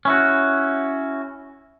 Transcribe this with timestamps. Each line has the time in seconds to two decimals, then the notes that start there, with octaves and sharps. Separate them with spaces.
0.05 C#4 E4 F#4